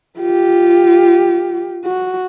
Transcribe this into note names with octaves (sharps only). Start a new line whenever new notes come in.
F4 G4
F#4